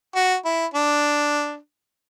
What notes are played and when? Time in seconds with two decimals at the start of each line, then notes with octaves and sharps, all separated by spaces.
0.15 F#4
0.45 E4
0.74 D4